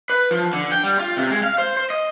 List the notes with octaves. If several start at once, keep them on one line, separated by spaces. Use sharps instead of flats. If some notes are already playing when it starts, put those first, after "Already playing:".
B4
F3
D3
G5
G3
F4
C3
G#3
F5
C5
C5
D#5